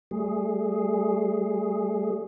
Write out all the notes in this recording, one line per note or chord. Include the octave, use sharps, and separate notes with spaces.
G3 A3 G#4